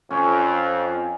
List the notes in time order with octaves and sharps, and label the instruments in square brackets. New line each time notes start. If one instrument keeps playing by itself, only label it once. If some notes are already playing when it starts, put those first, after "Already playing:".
[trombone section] F2 [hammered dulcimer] C#4